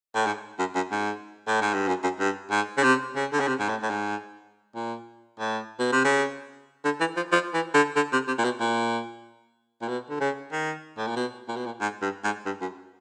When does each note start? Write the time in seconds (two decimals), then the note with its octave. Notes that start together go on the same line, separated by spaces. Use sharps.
0.15 A2
0.26 G#2
0.59 F#2
0.75 F#2
0.91 G#2
1.47 A2
1.61 G#2
1.74 G2
1.88 F#2
2.03 F#2
2.19 G2
2.51 G#2
2.77 C#3
2.83 C3
3.15 C#3
3.32 D3
3.40 C#3
3.47 C3
3.59 G#2
3.69 A2
3.83 A2
3.90 G#2
4.75 A#2
5.39 A2
5.79 B2
5.92 C3
6.04 C#3
6.85 D3
7.00 E3
7.17 F3
7.32 F3
7.54 E3
7.74 D3
7.96 D3
8.13 C3
8.28 C3
8.38 A#2
8.44 B2
8.60 A#2
9.82 A#2
9.88 B2
10.10 D3
10.20 C#3
10.52 D#3
10.98 A2
11.07 A#2
11.16 B2
11.48 A#2
11.56 B2
11.66 A#2
11.81 G#2
12.02 G2
12.24 G#2
12.45 G2
12.61 F#2